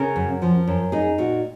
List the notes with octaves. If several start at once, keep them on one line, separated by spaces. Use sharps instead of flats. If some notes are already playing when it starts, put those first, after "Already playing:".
Already playing: C#3 A#4
F#2
F3
F#2
D#4 G#4
A#2 F#4